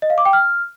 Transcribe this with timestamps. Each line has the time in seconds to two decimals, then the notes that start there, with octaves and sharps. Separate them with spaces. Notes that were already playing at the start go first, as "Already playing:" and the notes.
0.02 D#5
0.10 F5
0.18 D6
0.25 G5
0.33 F6